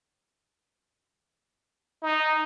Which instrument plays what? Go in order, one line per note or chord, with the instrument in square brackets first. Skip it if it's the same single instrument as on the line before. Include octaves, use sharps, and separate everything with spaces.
[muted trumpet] D#4